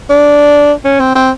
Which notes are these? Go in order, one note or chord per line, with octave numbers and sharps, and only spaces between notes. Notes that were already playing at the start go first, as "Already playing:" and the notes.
D4
C#4
C4
C4